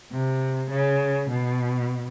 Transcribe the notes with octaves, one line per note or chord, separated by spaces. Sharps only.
C3
C#3
B2